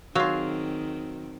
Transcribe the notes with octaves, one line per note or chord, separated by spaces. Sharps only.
D#3 F#3 C4 F4 F#4 G#4 F5